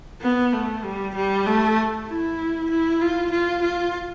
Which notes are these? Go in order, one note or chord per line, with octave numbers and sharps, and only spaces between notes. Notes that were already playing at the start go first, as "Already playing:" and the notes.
B3
A3
G3
G3
A3
E4
E4
F4
F4
F4